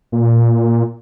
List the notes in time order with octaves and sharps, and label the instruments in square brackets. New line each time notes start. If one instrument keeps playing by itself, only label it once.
[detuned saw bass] A#2